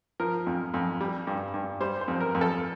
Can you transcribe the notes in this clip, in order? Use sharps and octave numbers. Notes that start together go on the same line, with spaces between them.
F3 A#4
F2
F2
G3
G2
G2
G3 C5
C5
F2
A#4
F2
A4